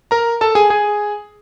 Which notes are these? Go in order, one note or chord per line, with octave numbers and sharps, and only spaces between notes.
A#4 A#5
A4 A5
G#4 G#5
G#4 G#5